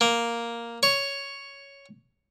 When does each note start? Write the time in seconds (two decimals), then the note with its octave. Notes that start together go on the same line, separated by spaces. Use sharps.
0.01 A#3
0.83 C#5